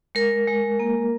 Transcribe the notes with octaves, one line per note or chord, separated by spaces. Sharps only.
G#3 A#4
G#3
A#3